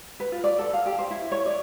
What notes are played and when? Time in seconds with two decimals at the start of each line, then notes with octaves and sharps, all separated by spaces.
0.20 B4
0.32 F4
0.44 D5
0.58 A4
0.73 F5
0.86 G4
0.98 C5
1.11 E4
1.32 C#5
1.46 D5